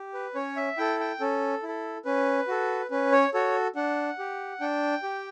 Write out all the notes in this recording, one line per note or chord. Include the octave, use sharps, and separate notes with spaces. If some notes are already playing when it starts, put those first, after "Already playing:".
Already playing: G4
B4
C#4 C#5
E5
E4 A4 G5
G5
C#4 A4
E4
A4
C#4 B4
F#4 A4
C#4 B4
C#5
F#4 A4 C#5
D4 F#5
G4
D4 G5
G4